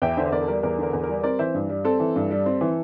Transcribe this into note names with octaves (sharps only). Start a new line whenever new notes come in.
E2 E5 G5
D3 C5 E5
E2 A#4 D5
A4
G3 A#4
E2 A#4
D3 A#4
E2
G3 A#4
C4 A#4 D5
E3 C5 E5
G2
G3
C4 A4
E3
G2
G3
C4
E3